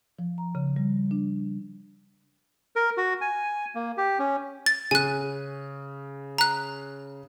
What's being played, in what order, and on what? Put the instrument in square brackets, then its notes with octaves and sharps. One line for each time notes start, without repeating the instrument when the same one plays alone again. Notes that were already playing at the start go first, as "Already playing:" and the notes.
[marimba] F3
A#5
C#3
G3
D4
[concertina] A#4
F#4
G#5
A#3
G4
C#4
[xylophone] A6
[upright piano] C#3 [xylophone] G#5 F#6
[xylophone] A#5 F#6